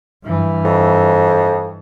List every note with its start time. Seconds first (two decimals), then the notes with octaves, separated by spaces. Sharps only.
0.24 G2 E3
0.65 F2